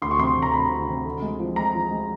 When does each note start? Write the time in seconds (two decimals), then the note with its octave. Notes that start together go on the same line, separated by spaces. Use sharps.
0.02 D2 C6
0.11 C#6
0.19 C3 C6
0.37 C3
0.42 A#5
0.54 C3 B5
0.71 D2
0.88 C3
1.05 D3
1.22 G#3
1.40 F3
1.56 G#3 A#5
1.74 F3
1.91 G#3